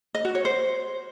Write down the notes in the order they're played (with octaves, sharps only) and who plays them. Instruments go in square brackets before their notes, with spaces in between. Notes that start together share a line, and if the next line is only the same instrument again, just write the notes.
[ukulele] D#5
F#4
C#5
C5